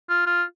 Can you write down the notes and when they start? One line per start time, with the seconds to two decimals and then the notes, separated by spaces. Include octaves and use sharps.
0.09 F4
0.26 F4